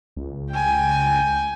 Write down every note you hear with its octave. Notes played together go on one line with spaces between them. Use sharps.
C#2
G5 G#5